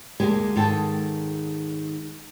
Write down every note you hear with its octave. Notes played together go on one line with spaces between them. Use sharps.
D2 G#3 A#3 G4 G#5
G#2 D#3 G#4 A4 G5 A5